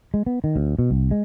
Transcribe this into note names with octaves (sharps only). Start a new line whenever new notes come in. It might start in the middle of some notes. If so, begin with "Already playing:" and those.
G#3
B3
D#3
D2
B2
C2
G#3